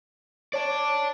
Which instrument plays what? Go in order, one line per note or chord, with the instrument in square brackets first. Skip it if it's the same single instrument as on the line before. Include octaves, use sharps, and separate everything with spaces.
[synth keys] C#5 [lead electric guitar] D5 A5